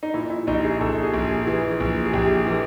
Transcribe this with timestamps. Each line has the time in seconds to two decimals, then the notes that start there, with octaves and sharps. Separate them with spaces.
0.03 D#4
0.14 A#2 E4
0.30 E4
0.47 A#1 D#4
0.64 G#4
0.81 A#1 A4
1.03 G#4
1.14 A#1
1.25 G#4
1.47 E3 G#4
1.80 A#1
2.06 G#4
2.13 A#1 G4
2.35 G4
2.46 E3 A4